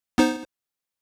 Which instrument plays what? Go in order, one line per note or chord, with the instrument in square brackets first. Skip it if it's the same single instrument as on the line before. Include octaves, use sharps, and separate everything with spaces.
[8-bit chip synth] B3 D#4 C5